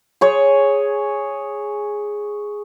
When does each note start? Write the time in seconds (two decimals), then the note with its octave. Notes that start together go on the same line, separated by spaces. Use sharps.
0.21 G#4 C#5